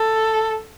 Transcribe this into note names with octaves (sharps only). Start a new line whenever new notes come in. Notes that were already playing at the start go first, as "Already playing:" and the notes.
Already playing: A4